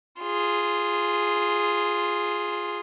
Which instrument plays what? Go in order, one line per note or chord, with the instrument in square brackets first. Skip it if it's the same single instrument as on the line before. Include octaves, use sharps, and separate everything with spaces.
[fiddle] F4 G#4